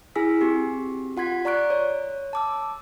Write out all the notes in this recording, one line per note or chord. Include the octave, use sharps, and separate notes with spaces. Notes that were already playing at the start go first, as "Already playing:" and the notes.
E4 G#4 G#5 E6 B6
C4 F#4 G4
F4 F#5 C6 G#6 B6
D5 A#5 C#6 F#6 D7
C#5
A5 D6 E6